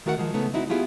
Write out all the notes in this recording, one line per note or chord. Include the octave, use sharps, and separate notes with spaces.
D#3 A3 F#4 A#4 F5 F#5
D#3 F3 G#3
C#3 A3 B3 D#4
C4 D#4 E4 F#4
B3 E4 F4 G4 G#4